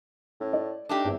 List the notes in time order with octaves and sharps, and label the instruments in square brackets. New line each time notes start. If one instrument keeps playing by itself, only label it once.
[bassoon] A2 [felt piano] C#4
[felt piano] D5
[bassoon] A3 [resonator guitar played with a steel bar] D4 D#4 G4
[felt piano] G1 C4 E5 [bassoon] E2